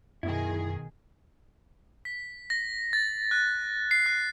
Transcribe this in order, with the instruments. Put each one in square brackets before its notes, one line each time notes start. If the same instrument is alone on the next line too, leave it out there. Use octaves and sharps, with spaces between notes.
[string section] B1 D#3 G#4 [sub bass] F#2 [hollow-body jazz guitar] E4
[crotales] B6
A#6
A6
F#6
C7
F#6